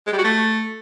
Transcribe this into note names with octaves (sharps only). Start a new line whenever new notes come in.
G#3
G3
F#4
A3